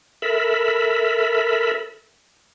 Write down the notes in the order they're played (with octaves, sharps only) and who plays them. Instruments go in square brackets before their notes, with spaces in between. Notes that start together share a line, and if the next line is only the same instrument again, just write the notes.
[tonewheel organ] A4 A#4 E5 B5